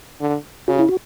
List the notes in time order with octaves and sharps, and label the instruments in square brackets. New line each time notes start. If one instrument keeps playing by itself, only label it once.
[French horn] D3
[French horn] C#3 [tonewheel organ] F#4
[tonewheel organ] E4
F#4